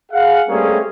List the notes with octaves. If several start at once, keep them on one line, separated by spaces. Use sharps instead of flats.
G#4 F5 F#5
G3 A3 A#3 C4 C#4 G#4